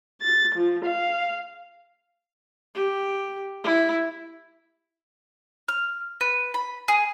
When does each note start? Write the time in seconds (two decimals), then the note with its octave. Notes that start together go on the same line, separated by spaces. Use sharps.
0.22 A6
0.55 F3
0.85 F5
2.75 G4
3.64 E4
5.68 F6
6.21 B4
6.54 B5
6.88 G#4